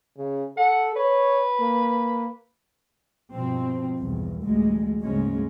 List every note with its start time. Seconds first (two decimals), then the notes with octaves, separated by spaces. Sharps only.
0.17 C#3
0.57 A4 F#5
0.96 B4 C#5
1.60 A#3
3.31 G2 B2 F3 C4
3.97 B1 E2 G2
4.41 A1 D2 G3 G#3
5.02 F#1 D2 G#2 C#3 G#3 C#4